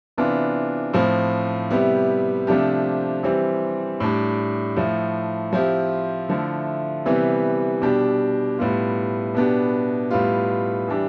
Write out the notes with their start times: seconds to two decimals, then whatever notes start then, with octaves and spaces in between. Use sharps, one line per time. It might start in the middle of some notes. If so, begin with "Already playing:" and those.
0.18 C3 E3 B3 D4 F4
0.93 A2 F3 C4
1.70 C3 G3 B3 E4 G4
2.47 C3 F3 A3 D4 G4
3.23 E3 G3 C4 G4
4.00 A2 G3 D4
4.76 A2 F3 A3
5.53 F3 C4 E4 G4
6.29 D3 F3 A3 E4
7.06 C3 E3 G3 B3
7.82 B2 G3 D4 G4
8.58 A2 G3 B3 F4
9.34 B2 B3 D4 G4
10.11 A2 G3 B3 F4
10.88 E3 G3 D4 G4